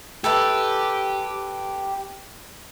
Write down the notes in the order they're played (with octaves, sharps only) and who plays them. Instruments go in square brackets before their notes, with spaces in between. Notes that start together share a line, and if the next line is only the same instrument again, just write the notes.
[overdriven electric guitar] G4 [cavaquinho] A4 B4 E5